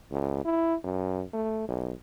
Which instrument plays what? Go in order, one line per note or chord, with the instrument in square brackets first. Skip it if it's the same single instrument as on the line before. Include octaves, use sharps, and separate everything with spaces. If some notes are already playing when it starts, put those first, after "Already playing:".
[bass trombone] C#2
E4
F#2
A3
B1